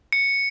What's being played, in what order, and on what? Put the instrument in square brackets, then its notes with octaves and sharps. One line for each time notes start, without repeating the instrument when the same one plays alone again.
[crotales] C#7